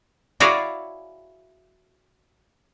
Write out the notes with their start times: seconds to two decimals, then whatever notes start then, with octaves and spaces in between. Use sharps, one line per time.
0.40 E4 F#4 G#4 C#5 D5 F5